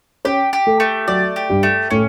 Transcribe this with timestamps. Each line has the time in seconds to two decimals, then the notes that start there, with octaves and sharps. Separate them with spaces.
0.25 C#4 G4 C#5
0.53 G4
0.67 A3 A4
0.80 A3
1.07 F#3 F#4 D5
1.36 G4
1.49 G2 G3
1.63 A3
1.90 A2 A3 C#4